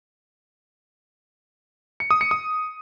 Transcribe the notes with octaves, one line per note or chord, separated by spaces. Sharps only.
C#7
D#6
C#7
D#6